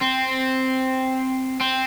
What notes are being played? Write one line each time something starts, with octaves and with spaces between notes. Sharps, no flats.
C4
C4